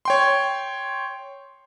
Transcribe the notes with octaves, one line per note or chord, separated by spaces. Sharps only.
C#5 G5 C6